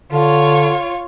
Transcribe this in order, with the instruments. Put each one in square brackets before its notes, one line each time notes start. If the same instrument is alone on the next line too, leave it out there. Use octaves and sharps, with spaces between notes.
[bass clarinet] D3 [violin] F4 C#5